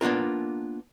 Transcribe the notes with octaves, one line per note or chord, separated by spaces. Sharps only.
A#3 B3 D4 F4 A#4